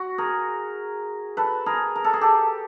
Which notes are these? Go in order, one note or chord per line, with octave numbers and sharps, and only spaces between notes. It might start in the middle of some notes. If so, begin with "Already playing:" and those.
Already playing: F#4
G#4 A#4
A4 B4
G#4 A#4
A#4
A4
G#4
G4 A4